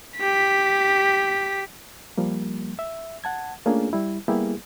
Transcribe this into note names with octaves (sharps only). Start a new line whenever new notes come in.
G4 B6
F3 G3 A#3
E5
F#5 A5 G#6
A3 A#3 C#4 D4 F4 G#4
G3 E4
G3 A#3 B3 E4 G4 G#4